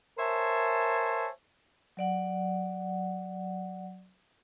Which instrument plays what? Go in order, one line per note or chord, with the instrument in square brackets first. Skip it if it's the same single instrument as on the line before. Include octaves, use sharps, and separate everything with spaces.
[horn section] A#4 C5 C#5 E5 G#5 A5
[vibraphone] F#3 D5 F#5